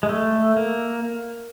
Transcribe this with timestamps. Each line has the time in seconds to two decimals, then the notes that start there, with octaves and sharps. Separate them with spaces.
0.03 G#3
0.09 A3
0.57 A#3